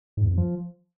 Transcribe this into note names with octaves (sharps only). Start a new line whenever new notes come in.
G#2
E2
F2
F3